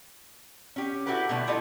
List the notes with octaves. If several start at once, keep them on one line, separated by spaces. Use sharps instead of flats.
C#4 G4
E4 F#4 G4 A4 B4
B2 D3 G3 A3 B3
E4 F4 A4 D5 D#5